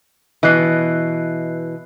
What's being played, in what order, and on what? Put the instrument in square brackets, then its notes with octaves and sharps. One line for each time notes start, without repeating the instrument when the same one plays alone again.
[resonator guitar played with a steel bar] B2 E3 [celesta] D#5 F#6 C7